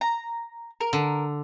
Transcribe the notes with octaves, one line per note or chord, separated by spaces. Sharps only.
A#5
A#4
D3